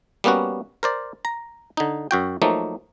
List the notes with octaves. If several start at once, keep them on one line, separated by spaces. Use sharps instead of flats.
G3 A#3 B3 C#4 F#4
A#4 C5 D5
A#5
D3 D#4
F#2 F#4 G5
F3 F#3 A3 A#3 D#4